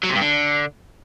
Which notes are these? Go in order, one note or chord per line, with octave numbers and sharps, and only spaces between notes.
F#3
C3
G2
D3